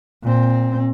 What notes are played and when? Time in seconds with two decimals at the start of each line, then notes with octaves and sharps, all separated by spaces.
0.23 A#2 C4